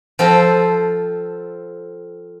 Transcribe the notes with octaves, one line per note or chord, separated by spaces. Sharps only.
F3 C4 A4 C5